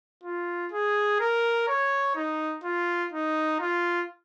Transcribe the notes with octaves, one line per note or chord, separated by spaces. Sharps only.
F4
G#4
A#4
C#5
D#4
F4
D#4
F4